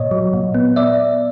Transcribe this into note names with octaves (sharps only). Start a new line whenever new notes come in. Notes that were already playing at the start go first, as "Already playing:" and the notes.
Already playing: A#2 C#5 D#5
F#3
A#2
B3
D5 E5